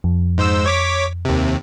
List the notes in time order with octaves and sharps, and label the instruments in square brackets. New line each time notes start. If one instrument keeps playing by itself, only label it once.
[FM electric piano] F2
[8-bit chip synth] G#2 C5 E6
C#5 D6 B6
D#2 C3